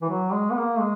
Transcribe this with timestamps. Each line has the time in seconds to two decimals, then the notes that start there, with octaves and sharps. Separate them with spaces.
0.02 E3
0.09 F#3
0.32 G#3
0.50 B3
0.56 A#3
0.79 G#3